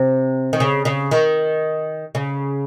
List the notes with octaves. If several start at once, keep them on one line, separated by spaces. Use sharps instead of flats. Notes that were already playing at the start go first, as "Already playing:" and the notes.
Already playing: C3
D#3
C#3
C#3
D#3
C#3